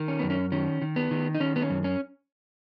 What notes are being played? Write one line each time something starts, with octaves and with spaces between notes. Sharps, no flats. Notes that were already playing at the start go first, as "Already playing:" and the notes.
Already playing: D#3
C#4
F#2 B3
C#4
D#3 C#4
D#3
B3
D#3
D#4
D#3 C#4
B3
C#4
F#2
C#4